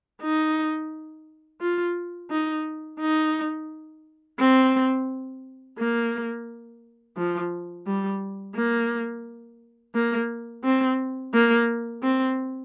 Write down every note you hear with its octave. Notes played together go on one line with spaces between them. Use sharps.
D#4
F4
D#4
D#4
C4
A#3
F3
G3
A#3
A#3
C4
A#3
C4